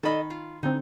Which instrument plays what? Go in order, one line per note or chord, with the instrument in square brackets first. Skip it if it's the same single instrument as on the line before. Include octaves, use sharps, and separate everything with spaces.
[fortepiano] D#3 B5 [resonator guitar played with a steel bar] A4 D#5
[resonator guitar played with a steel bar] F4
[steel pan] D3 C4 [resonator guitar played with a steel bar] D#4